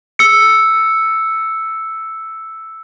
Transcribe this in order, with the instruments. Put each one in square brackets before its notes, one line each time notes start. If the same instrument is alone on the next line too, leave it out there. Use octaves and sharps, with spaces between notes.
[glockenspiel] E6 C#7